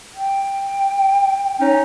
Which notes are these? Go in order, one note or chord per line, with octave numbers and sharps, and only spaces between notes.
G5
C#4 D#4